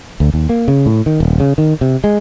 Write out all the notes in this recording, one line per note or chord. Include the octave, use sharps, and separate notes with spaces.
D2
D#2
A#3
C#3
A2
D#3
D#1
C#3
D#3
C3
G#3